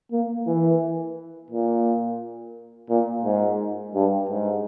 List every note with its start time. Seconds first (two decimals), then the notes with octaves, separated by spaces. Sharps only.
0.12 A#3
0.47 E3
1.51 A#2
2.90 A#2
3.25 G#2
3.95 G2
4.29 G#2